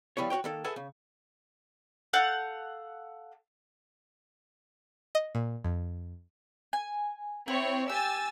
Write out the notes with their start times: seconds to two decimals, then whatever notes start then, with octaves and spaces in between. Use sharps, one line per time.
0.17 F3 G3 B3 E4 C#5
0.30 F#4 B4 C#5 G5
0.44 D#3 A#3 A4
0.64 G#4 A4 B4 E5 F#5 G#5
0.76 C#3
2.13 A4 F5 F#5 G6
5.15 D#5
5.35 A#2
5.64 F2
6.73 G#5
7.48 C4 E4 C#5
7.89 G4 G#5 E6 A6